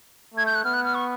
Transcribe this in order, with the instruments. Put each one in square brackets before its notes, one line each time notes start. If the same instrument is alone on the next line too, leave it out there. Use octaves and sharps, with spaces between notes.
[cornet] A3 [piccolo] G#6
[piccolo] G6
F#6
[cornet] B3 [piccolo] F6
[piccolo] F#6
F6
C#6